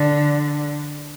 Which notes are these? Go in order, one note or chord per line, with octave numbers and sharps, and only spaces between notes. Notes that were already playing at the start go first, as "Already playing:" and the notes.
Already playing: D3